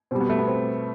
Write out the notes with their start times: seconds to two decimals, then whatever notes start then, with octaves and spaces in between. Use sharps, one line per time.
0.11 B2 G3 C4
0.20 B3
0.29 A3
0.38 B3
0.47 C4